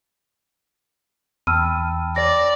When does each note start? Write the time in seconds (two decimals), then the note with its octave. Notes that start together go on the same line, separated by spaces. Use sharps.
1.47 E2 G5 A5 B5 E6 F6 D#7
2.16 D5 A#6